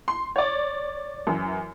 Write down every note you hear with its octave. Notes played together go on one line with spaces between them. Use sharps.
C6
C#5 D5
F#2 E3